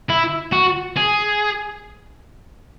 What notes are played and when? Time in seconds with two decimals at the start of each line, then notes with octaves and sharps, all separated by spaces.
0.10 E4
0.53 F#4
0.97 G#4